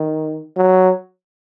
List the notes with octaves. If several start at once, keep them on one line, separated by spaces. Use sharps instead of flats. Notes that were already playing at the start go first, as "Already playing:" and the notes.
Already playing: D#3
F#3